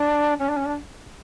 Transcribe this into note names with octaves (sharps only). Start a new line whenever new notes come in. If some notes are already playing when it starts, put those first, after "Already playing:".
Already playing: D4
C#4
D4
C#4
D4